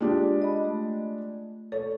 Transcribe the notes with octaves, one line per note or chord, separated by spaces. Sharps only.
G#3 D4 F4 G4
D#5 B5
A3
A4 C#5